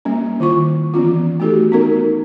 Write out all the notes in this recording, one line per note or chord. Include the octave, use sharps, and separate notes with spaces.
G3 A#3 C#4
D#3 E4 F4 C#6
E3 B3 C#4 F4
A3 D#4 F#4 G4 A4
B3 C#4 D#4 A#4